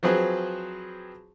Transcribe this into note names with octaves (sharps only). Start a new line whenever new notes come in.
F3 F#3 C4 G#4 B4